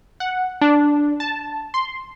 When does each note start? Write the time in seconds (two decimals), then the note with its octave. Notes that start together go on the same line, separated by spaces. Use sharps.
0.20 F#5
0.61 D4
1.20 A5
1.74 C6